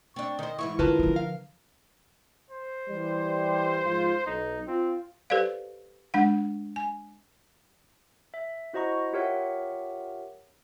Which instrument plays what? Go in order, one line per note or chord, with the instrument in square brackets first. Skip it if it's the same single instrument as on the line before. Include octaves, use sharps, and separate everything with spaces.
[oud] C4 D4 [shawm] C#6
[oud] D#3 C5 [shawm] D#5
[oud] G#2 E3 E4 [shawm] C#6
[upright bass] D3 [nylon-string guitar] F4 B4 A5 [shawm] A#4
[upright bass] D3 F3
[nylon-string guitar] F5
[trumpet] C5
[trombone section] E3 G3
G#2 F3 F4
[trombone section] B1 [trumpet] D#4
[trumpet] C4 [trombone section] F4
[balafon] G4 A4 B4 C5 D5 F5
G#3 D4 F#5
G#5
[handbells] E5
E4 F#4 C5 D#5 A#5 C#6
F4 G4 A#4 C#5 E5 F#5